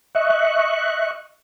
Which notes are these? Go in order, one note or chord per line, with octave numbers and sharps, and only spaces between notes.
D#5 E5 C#6 F#6